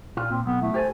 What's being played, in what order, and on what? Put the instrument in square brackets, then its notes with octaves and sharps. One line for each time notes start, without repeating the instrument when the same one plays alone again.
[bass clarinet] A#2 [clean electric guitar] F4
[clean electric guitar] A#2 [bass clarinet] C4
[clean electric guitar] B1 [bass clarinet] B3
[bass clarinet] A3 [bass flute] E4
[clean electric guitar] G4 A4 G#5 [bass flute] C5